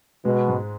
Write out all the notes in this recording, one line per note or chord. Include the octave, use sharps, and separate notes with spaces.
B2 G#3
G#2